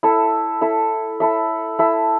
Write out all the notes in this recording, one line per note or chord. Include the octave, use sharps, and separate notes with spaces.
E4 A4 E5
E4 A4 E5
E4 A4 E5
E4 A4 E5